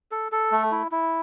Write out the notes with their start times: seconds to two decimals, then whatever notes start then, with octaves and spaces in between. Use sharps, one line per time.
0.12 A4
0.32 A4
0.52 A3
0.72 E4
0.92 E4